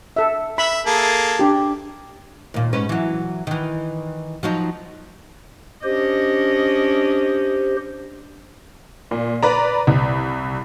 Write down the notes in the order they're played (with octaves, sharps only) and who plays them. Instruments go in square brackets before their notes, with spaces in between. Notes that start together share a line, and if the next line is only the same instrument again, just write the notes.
[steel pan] A4 E5
[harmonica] E5 [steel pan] B5
[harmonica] A#3 G#4 A4
[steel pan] D4 G4
[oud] D#2 A#2
G#2 C#4 B4
E3 F#3
D#3 E3
F3 F#3 D#4
[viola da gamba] C#4 D4 D#5 [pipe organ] G4 C5
[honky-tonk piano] A#2
B4 D5 A#5
C2